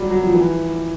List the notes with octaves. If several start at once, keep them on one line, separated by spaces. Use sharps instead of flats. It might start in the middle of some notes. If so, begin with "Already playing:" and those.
Already playing: F#3 G3
F#3
F3
E3